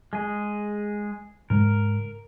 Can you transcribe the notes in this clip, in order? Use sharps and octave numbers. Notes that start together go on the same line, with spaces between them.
G#3 G#4
G#2 C#3 G#3 A#4